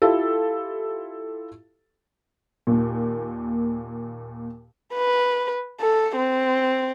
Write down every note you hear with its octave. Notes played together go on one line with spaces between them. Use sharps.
E4 F4 G4 A4
D#2 A#2
B4
A4
C4